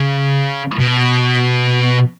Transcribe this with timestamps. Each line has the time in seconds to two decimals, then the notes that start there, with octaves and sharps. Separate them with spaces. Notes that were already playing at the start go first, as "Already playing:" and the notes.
Already playing: C#3
0.80 B2